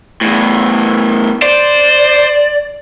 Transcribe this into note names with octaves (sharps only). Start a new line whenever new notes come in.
E2 A2
C5 D5